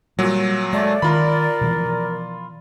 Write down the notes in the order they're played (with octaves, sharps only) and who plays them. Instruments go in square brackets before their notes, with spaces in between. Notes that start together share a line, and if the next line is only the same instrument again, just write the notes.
[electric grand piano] A#2 F#3 [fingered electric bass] G3
[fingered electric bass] G#3 [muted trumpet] A3 [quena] D5
[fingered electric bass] D#3 [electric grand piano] F4 B5 [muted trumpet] A#4
[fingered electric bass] B2 E3 F3